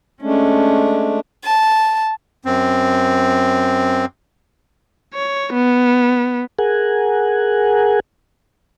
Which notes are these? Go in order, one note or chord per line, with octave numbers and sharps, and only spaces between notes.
G#3 A3 C#4 D4
A5
F#2 C4
C#5
B3
G#4 A#4 F#5 G#5